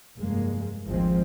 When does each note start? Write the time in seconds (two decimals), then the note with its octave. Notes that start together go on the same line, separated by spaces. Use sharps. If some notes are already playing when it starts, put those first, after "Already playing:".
0.17 F1 G2 G#3 A#3
0.87 G#1 D2 F3 G#3 C4